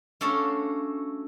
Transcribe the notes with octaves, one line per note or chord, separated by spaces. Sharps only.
A3 C#4 D4 F#4 A4 F5